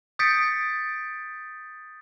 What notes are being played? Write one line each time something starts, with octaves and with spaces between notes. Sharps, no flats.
D#6 G6 A6 B6 C#7 D7